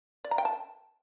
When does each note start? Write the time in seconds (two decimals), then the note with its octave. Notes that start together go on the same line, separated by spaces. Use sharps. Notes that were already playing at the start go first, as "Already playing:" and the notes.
0.25 D5
0.31 A#5
0.38 G5
0.45 A5